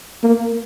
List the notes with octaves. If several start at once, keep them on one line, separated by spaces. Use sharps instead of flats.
A#3